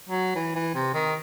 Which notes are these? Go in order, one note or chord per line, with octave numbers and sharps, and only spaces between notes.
F#3
E3
E3
C3
D#3